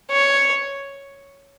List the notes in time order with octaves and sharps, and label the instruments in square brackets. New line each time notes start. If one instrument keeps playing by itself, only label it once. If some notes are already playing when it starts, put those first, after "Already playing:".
[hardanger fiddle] C#5